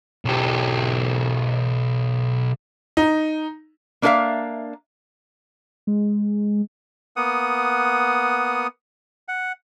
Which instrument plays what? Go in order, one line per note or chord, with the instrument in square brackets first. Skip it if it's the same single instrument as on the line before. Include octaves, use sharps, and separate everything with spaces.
[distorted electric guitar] B1 G4
[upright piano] D#4
[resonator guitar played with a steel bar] A#3 D4 G#4 A#4 E5 F5
[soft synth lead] G#3
[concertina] A#3 B3 F#5 D#6
F#5